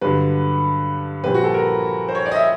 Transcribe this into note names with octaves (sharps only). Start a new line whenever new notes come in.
G2 D3 F#3 B4
A#1 A#2 G3 C4 B4
F#4
A4
A#4
C5
C#5
D5
D#5
E5